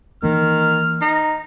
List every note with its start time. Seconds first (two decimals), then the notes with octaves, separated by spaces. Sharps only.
0.23 D#3 E3 A#3 F6
1.02 D#4